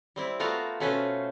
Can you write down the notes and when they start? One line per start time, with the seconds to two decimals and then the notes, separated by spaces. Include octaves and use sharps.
0.16 G3 C4 E4
0.40 A3 B3 F4 F#4 A#4 F5
0.80 B2 A3 C#4 B4 C5